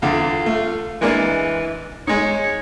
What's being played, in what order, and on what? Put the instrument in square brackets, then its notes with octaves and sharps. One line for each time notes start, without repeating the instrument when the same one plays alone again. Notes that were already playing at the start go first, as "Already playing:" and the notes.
[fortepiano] E2 D3 [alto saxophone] F4
[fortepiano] A3
[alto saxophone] E3 [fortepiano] G#3 A#3 D4
[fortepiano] G#3 D#4 [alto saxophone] C#5